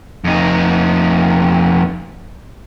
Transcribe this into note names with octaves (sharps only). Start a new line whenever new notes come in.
F2 D#4